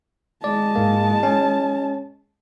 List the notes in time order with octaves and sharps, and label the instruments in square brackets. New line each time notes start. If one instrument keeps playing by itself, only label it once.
[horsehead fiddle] G#3 A5 [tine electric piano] D5
[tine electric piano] G#2 A#3
C#4